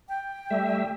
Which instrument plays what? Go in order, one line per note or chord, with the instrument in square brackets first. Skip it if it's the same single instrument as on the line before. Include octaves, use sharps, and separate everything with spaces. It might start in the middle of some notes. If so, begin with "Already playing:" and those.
[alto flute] G5
[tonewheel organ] G3 A3 E5